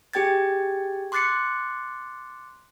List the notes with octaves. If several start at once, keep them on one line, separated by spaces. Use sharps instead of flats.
G4 G#4 G5 G#6 A6
C6 D6 F#6 A6 C7 C#7